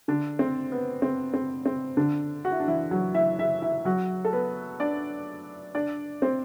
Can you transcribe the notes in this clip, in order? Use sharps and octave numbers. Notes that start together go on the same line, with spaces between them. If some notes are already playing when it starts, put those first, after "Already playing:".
D3 D4
C4
B3
C4
C4
C4
D3 D4
F#4
E4
D4
E3 E4
F#3 F#4
E4 E5
E4 E5
E4 E5
F#3 F#4
A4
B3 B4
D4 D5
D4 D5
C4 C5